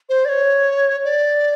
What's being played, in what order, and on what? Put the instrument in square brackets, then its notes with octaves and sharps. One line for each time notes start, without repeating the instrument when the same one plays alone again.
[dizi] C5
D5
C#5
D5